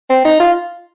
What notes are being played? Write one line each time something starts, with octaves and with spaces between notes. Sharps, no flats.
C4
D#4
F4